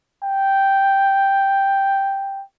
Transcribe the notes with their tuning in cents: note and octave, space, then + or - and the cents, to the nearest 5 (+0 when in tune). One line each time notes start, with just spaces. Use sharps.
G5 +0